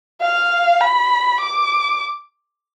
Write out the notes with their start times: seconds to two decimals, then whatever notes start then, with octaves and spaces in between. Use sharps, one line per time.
0.21 F5
0.81 B5
1.41 D6